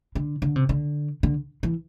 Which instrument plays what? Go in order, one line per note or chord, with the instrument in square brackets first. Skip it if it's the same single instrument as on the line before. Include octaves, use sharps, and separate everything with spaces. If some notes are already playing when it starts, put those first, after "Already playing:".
[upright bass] D3
D3
C3
D3
D3
E3